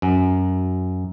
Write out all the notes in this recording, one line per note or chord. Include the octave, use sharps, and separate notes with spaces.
F#2